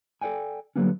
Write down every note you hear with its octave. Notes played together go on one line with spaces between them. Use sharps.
A4 A#4 D5 G5 G#5
D3 F#3 G3 A#3 B3 C#4